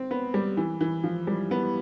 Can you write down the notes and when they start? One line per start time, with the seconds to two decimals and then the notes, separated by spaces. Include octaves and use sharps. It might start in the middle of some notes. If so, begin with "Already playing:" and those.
Already playing: C4
0.11 B3
0.34 G3
0.57 E3
0.81 E3
1.04 F3
1.27 G3
1.51 B3